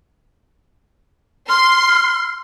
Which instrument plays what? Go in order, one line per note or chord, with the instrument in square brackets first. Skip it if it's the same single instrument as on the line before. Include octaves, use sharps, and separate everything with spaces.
[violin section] C6 [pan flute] F6